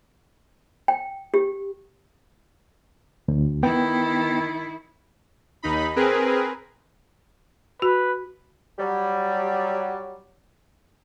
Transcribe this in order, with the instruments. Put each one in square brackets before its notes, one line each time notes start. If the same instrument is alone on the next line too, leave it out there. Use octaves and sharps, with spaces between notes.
[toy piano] G5
G4
[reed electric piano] D2
[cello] D#3 E4 [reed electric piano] B3 G5
[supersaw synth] D#2 D#4 B5
C4 G#4 A#4 B4
[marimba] F#4 [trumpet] B4
[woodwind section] F#3 G3